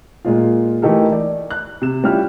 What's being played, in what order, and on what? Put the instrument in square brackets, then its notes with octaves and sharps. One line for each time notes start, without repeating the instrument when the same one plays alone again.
[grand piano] A#2 G#3 F4
E3 A3 D#4 G4 A4 A#4
D5
F#6
C3 E7
G3 C#4 E4 F4 G4 F6